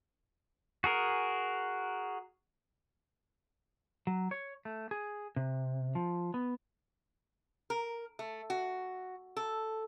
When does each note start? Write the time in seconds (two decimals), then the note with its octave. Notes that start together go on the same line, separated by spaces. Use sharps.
0.84 F#4 G#4 A#4
4.07 F#3
4.31 C#5
4.65 A3
4.91 G#4
5.36 C3
5.95 F3
6.34 B3
7.70 A#4
8.19 A3
8.50 F#4
9.37 A4